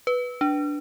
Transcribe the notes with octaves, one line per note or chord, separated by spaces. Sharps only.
B4
D4